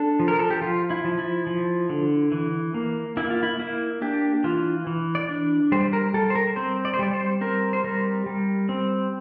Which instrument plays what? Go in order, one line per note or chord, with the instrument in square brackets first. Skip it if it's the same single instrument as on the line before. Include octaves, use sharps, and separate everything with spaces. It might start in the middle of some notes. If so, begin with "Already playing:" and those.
Already playing: [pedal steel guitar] D4 A4
F3
A#4
A4
G4
F3 F4
E4
F3
E4
F3
D3
E3
A#3
A#3 E4
F4
E4
A#3 E4
D4 G4
E3 F4
E3
D5
D4
G3 C5
A#4
G3 A4
C5
A#4
C4 C5
D5
C5
G3 D5
C5
C4 A#4
C5
G3 A#4
G3
C4